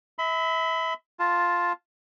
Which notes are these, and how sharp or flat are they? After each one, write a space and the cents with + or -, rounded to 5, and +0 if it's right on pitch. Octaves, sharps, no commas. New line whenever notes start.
E5 -25 B5 +30
F4 +5 A5 +0